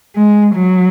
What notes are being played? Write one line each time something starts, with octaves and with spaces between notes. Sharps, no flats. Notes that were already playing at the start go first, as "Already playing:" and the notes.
G#3
F#3